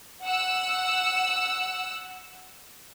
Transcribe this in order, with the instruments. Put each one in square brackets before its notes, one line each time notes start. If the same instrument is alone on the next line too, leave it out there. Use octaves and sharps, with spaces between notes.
[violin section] F#5 E6